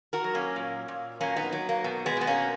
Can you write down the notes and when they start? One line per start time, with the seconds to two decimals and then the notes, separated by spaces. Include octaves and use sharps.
0.13 F#4 A#4
0.24 F#3
0.34 A#3 C#4
0.56 A#2
0.88 A#2
1.20 F#3 A#3 C#4
1.36 B3 D#4
1.52 F#3
1.69 A#3
1.84 B2
2.06 G#3 B3
2.17 B2 B3
2.27 A#3 C#4